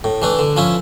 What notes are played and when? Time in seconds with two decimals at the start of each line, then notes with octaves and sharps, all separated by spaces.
0.04 A2
0.22 E3 A3 D4
0.39 D3
0.57 F3 C#4 E4